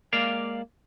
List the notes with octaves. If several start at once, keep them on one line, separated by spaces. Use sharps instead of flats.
G#3 A#3 D5 F5